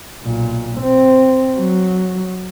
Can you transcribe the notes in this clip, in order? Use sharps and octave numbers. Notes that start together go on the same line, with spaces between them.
B1 A#2
C4
F#3